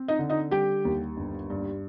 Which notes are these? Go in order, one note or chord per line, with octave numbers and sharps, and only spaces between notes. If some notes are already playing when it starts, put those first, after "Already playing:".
Already playing: C4
D#4 D#5
D3
D#4 D#5
G3 G4 G5
D#2
G1
G2